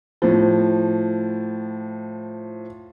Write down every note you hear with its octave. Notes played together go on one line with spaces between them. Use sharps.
A2 F3